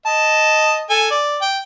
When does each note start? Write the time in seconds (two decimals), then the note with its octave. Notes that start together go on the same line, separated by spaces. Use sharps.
0.06 D#5 A5
0.90 A4 G#5
1.11 D5
1.42 G5